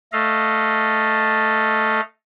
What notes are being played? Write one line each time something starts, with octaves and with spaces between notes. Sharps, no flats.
A3 A4 D#5 F5